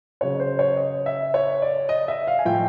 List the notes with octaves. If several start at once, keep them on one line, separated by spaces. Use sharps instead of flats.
C#3 F#3 C#5
C5
C#5
D#5
E5
C#5
D5
D#5
E5
F5
G#5
A2 F3 G5